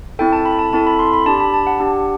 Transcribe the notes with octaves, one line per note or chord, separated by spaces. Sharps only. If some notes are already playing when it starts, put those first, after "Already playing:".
C4 E4 A4 G5
A5
B5
A5
C4 E4 A4 A5
B5
C6
B5
D4 G4 A5
B5
A5
F#5
D4 G4